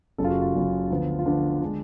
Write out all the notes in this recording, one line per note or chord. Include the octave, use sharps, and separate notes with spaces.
F#1 F#2 C#3 A4
F4
F#4
F4
F#1 F#2 C#3
D2 D3 F3 B3
F4
D2 D3 F3 B3 D4
D3 G#3 D4